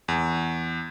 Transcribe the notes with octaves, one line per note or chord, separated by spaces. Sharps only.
E2